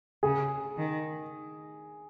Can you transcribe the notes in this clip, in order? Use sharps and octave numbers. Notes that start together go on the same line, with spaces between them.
C#3 G#4
D#3